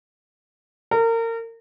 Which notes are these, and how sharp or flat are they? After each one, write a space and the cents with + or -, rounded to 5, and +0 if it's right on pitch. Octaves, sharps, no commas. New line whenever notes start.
A#4 -30